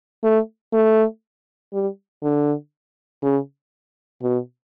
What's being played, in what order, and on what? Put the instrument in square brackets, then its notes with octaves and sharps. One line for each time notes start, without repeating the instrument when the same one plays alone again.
[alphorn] A3
A3
G3
D3
C#3
B2